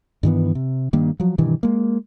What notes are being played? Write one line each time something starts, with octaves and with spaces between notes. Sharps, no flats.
G2 D#3 E3 B3
C3
G2 D#3 A#3
F3 F#3
G2 B2 D#3 E3
G#3 A#3